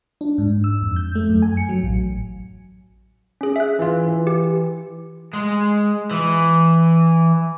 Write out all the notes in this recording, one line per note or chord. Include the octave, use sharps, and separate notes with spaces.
D4
G#2
E6
F2
G6
A3
F#2
G#5
C#7
F#3
A1
C#4 G#4
E5 F#6
E3 F4
E3
G4
G#3
E3